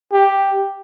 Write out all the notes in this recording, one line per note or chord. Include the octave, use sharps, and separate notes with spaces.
G4